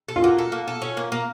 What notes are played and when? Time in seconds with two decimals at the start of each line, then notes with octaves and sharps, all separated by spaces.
0.08 A4
0.16 F4
0.22 A#3 F#4
0.38 A4
0.52 A#3
0.68 A4
0.82 C#4
0.97 A#3
1.12 A#3